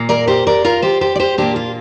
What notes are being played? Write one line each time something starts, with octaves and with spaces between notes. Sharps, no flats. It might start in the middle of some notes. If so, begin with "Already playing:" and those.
Already playing: A#2 A#3
A#4 D5
G4 C5
A#4 D5
F4 A#4
G4 C5
G4 C5
D5
G4 C5
A#2 A#3 D4 G4
F4